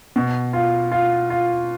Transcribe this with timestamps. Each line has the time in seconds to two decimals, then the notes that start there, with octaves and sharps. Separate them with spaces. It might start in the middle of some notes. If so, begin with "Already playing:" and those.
0.16 B2
0.53 F4
0.92 F4
1.30 F4